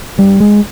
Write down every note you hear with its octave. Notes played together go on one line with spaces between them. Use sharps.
G2 G3
G#3